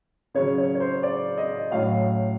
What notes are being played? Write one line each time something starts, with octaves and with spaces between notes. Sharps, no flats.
C#3 F#3 C#5
C#5
C#5
C5
D5
D#5
A2 F#3 F5